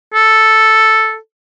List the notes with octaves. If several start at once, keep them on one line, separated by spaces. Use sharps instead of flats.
A4